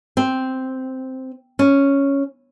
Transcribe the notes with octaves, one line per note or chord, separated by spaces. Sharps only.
C4
C#4